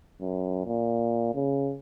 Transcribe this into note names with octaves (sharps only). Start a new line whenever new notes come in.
F#2
A#2
C#3